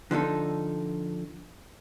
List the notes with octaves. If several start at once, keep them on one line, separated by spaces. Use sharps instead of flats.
D3 F3 D#4 A4